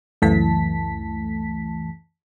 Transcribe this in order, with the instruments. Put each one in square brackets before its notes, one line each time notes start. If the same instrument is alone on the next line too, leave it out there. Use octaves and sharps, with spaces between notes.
[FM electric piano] C#2 F#2 E3 A3 A5 B6